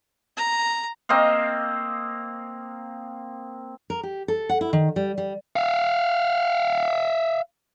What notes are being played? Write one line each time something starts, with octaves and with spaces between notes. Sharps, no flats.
A#5
A#3 C4 D#5 F5
A#4
G4
A4
F#5
E4
D#3
G3
G3
E5 F5